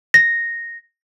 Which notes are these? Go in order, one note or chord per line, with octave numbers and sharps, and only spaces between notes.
A#6